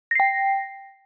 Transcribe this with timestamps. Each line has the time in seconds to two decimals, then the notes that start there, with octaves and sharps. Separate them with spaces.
0.11 A#6
0.15 C7
0.20 G5